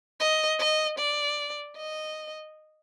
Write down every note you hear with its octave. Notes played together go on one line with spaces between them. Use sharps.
D#5
D#5
D5
D#5